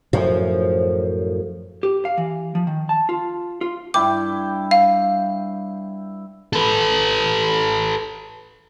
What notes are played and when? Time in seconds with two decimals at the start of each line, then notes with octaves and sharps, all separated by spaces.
0.13 F#2 A2 F3
1.83 G4
2.05 F5
2.18 E3
2.55 F3
2.67 D#3
2.89 A5
3.09 F4
3.61 F4
3.94 G2 E4 G5 D6
4.71 F5
6.53 A4 B4